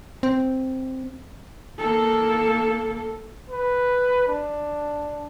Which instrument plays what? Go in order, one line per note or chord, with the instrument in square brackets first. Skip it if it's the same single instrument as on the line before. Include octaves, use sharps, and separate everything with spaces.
[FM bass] C4
[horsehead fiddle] A#3 A4
[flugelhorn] B4
D4